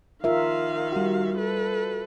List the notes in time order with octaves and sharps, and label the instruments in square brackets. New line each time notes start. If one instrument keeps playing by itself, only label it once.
[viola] D#3 F5 [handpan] F4 A#4 E5
[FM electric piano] G3 F#4
[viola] A4 B4